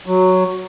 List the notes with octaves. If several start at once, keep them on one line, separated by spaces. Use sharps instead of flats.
F#3